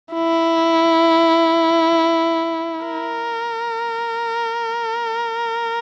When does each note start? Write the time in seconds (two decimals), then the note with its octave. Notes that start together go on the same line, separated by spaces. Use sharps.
0.13 E4
2.85 A#4